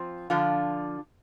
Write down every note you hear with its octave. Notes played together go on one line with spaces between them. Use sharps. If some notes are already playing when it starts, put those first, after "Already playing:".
Already playing: F3 C4 F4
D3 F3 D4 F4